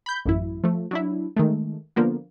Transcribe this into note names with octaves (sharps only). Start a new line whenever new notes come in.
B5 G6
A1 F#2 E4
F3 A3
F#3 D4 E4
D#3 G#3 A3
D3 F3 A#3 B3